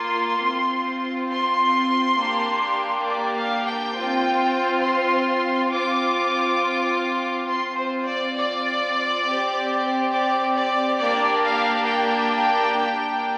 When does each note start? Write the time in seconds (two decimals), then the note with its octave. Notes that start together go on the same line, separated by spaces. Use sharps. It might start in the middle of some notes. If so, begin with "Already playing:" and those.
Already playing: A#3 F4 C6
0.42 C4 F4
1.29 C6
2.17 A#3 D4 G4
3.07 D5
3.35 F5
3.65 G5
3.94 C4 F4
4.82 C6
5.70 C4 F4 D6
7.46 C4 F4 C6
7.76 C5
8.05 D5
8.35 D5
9.23 C4 G4
10.12 D5
10.55 D5
11.00 A#3 D4 G4 D5
11.44 F5
11.87 G5
12.76 A#3 D4 G4